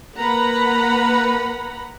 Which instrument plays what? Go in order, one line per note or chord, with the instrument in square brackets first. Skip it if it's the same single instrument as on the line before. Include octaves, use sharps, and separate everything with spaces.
[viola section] A#3 B4 F#5 A#5 B5